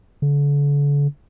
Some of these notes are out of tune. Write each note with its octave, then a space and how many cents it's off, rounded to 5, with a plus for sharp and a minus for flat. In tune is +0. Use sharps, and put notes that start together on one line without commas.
D3 -40